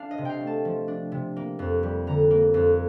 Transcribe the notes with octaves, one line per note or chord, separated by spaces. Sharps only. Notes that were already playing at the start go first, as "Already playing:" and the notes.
Already playing: D4 F5 A5
D#5
C3
F5 G5
A3
A5
F3
D4
C3
A#3
F2
G3
D3 A#5
A#3
F2